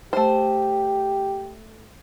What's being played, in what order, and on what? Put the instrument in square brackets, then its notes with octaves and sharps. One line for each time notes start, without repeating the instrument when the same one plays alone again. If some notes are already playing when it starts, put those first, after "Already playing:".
[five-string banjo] A3 C5 [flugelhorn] G4